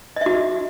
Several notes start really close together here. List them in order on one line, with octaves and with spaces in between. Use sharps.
D#5 E5 F#4